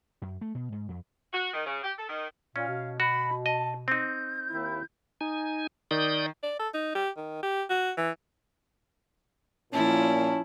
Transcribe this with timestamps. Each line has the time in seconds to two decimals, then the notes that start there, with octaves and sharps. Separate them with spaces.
0.22 F#2
0.41 A3
0.55 B2
0.72 G#2
0.89 F2
1.33 F#4
1.54 D#3
1.66 C#3
1.84 G4
1.98 A4
2.09 D#3
2.56 A#2 C#4 F5
2.68 B2
3.00 F#4 B5
3.46 D#5 A5
3.88 C4 D#4 G6
4.49 D#2 D#3 E4
5.21 D#4 G#5
5.91 D#3 D5 D#6 G6
6.43 D5
6.59 A4
6.74 D#4
6.95 G4
7.17 D#3
7.43 G4
7.69 F#4
7.97 E3
9.73 A#2 F3 C#4 E4 A5